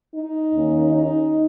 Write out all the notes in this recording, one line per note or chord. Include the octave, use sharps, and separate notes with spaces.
D#4
D#2 D#3 A#3 C#4
D#4